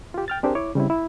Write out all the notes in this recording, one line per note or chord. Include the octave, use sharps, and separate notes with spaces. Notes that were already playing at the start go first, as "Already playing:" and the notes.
F4 G4
G5 F6 A6
C4 D4 G4 G#4 A#4 C5
E4 C#5 D6
C#3 G3 C4 E4
E4